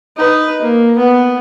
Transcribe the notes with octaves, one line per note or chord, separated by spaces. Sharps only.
D#4 B4
A#3
B3